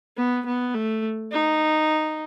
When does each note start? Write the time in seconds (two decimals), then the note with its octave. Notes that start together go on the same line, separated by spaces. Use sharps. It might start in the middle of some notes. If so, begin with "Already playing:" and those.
0.17 B3
0.46 B3
0.74 A3
1.32 D#4